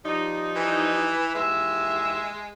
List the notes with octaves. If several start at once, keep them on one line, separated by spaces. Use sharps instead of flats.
F3 G3 D#4
E3
D#2 E3 G#3 E5